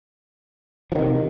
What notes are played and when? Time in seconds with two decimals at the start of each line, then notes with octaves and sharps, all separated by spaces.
0.92 F3
0.95 D#3
0.99 C3